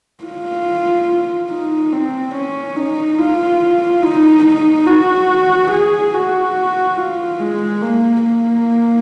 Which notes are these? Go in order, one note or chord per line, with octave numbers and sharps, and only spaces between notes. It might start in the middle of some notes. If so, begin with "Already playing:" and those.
F4
D#4
C4
C#4
D#4
F4
D#4
D#4
F#4
G#4
F#4
F4
G#3
A#3
A#3